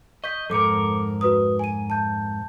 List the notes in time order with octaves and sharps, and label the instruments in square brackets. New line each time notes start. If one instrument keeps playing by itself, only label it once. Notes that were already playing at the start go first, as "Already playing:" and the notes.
[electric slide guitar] D#5 [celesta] C#6 G6 B6
[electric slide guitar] F2 G#2 A#4 [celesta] A4 D6 C#7
[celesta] F#4 B4 D#6
G#5 D#7
A5 G6